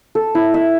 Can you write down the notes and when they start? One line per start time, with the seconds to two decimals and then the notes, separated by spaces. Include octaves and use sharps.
0.15 A4
0.35 E4
0.54 E5